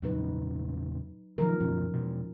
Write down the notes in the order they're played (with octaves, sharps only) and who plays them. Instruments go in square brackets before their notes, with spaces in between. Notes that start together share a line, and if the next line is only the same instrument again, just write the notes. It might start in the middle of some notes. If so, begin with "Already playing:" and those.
[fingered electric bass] E2 A#2 C#3 [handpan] F#3 D#4 B4
[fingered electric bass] D#3 F#3 [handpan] F3 D#4 A#4
[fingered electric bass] F#2 B2 D3 [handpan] C#4
[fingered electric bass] E2 B2